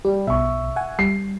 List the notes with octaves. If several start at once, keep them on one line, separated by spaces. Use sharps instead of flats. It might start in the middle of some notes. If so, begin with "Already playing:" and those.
G3 G4
B1 B2 E5 C#6
F#5 G#5
G3 C7